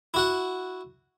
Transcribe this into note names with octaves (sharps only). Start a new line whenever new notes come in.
E4 F#4 F#5